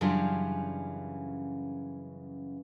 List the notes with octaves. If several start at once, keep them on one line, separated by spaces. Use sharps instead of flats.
F#2 C#3 E3 G3 D4 F4